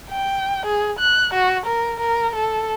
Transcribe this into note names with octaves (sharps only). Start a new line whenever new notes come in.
G5
G#4
F#6
F#4
A#4
A#4
A4